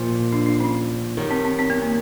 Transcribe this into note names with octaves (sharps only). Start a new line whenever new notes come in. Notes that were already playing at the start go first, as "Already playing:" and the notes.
Already playing: A#2 F3 A#3
D4
D4
C#4
F#2 D#3 G3
C4
C4
C4
B3
A#3